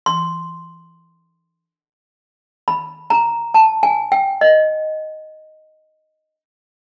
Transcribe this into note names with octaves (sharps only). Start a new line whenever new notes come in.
C6
B5
A#5
A5
G#5
G5
D#5